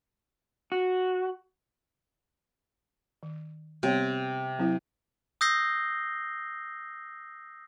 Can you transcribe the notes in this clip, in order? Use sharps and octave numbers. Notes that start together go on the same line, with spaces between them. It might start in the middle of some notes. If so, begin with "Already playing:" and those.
F#4
D#3
C3 G3 B3 C#5
F#3 C4 E4
D#6 E6 G6 A#6 C7 G7